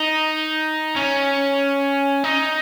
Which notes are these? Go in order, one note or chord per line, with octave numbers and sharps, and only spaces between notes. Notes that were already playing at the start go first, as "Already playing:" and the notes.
Already playing: D#4
C#4
D#4